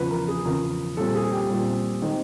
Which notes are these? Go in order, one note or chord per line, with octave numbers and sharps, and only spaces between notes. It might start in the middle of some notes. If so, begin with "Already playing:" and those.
Already playing: E2 C#3 F3 B4
A#4
G#4
E2 C#3 F3 A#4
A#2 G3 C4 A4
G#4
G4
A#2 G3 C4
D#3 G#3 C4